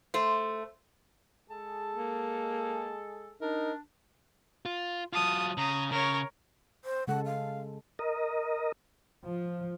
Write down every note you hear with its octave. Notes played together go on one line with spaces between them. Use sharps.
A3 C5
G#3 G#4 A4 A5
A#3
D4 D#4 A#4
F4
F#3 F4 A5 D#6
C#3 A#5 D#6
C#3 A#4 C#5
C5
C#3 G#3 A4 F#5
F5
A#4 D#5
F3